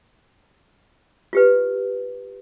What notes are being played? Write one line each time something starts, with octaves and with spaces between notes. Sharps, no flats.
F4 G4 B4